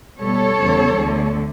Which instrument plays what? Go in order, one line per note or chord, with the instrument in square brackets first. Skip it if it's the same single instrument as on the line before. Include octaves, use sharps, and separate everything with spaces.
[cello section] B2 G3 B3 A4 C#5
E2 C#3 E3 G3 B3
D2 D3 A3